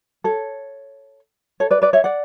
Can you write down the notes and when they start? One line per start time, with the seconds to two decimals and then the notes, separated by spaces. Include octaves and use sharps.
0.24 A4 C#5
1.60 A4 C#5
1.71 B4 D5
1.82 B4 D5
1.93 C#5 E5
2.04 D5 F#5